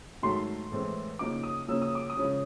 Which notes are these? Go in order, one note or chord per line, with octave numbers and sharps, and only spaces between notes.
G#2 D#3 F#3 A3 C6
A2 E3 G#3 C4
C#3 F3 A#3 D#4 D6
D#6
C#3 F3 A#3 C#4 E6
D#6
D6
D#6
C#3 F3 G#3 C#4